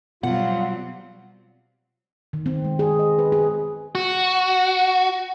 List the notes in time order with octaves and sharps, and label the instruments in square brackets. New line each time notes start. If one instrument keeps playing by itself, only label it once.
[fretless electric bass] B2 [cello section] F#3 G3 C4 [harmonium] F4 [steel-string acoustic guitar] F#5
[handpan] D#3
C4
G#3
G#4
D#5
B4
G#4
[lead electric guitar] F#4